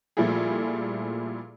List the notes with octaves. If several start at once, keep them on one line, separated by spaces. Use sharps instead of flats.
A#2 F3 G3 A3 E4 G#4